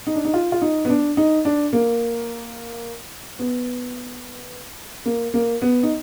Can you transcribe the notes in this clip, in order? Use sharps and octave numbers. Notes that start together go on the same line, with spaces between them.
D#4
D4
D#4
F4
F4
D#4
B3
D4
D#4
D4
A#3
B3
A#3
A#3
B3
D#4